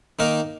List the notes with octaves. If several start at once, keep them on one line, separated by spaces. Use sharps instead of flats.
D#3 A#3 D#4 A#4